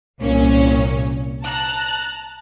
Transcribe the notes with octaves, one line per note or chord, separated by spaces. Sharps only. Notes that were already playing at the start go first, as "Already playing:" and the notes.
C2 A#2 C#4
A5 A#5 F#6